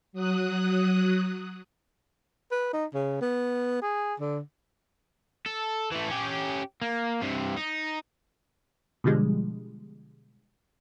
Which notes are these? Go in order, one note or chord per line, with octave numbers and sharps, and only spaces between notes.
F#3 D#6 F#6
B4
D#4
C#3
B3
G#4
D3
A4
E3 A3
C#4 G4
A#3
G2 C3
D#4
B2 D3 F3 G3 G#3